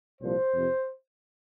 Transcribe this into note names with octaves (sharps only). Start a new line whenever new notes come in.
C2 A#2 F3 C5
F2 C3